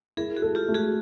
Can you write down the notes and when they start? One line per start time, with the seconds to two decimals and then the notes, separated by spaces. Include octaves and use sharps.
0.17 E4 G#4 A#4
0.36 F#4 G#4
0.42 A4
0.55 F4 G4
0.68 A3
0.75 F#4 G#4